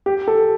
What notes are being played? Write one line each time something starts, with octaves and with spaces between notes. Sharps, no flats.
G4
A4